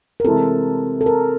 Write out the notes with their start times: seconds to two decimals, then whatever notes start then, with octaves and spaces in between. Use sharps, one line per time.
0.20 A#4
0.25 C3 E3 G#3 C4 A4
1.01 A4
1.06 A#4